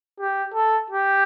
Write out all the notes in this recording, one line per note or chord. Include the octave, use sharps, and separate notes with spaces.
G4
A4
G4